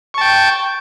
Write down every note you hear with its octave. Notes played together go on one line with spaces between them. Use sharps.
G5 A5 C#6